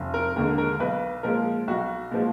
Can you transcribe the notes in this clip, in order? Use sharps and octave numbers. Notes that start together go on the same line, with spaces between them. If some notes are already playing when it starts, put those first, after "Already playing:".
Already playing: F1
A#4
D#2 D3 G#3 A#4
A#4
B1 B4
A#2 F3 G#3 A#4
B1 F#4
A#2 F3 G#3